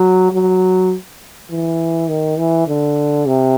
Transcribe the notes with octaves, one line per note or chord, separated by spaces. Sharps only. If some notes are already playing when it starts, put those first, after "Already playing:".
Already playing: F#3
F#3
E3
D#3
E3
D3
C3